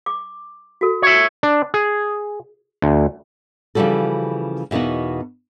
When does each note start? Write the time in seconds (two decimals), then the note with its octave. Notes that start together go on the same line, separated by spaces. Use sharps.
0.06 D6
0.81 F#4 A4
1.02 C#5 E5
1.43 D4
1.74 G#4
2.82 D2
3.75 C#3 E3 F3 G3 F#4 A4
4.71 E2 B2 A#3 D#4 F#4